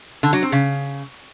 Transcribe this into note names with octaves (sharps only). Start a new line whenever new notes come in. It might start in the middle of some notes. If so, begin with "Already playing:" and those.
D3
F#3
C4
C#3